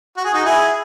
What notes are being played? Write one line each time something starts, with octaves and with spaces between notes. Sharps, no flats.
F#4
G#4
D#4 F#4
E4 G#4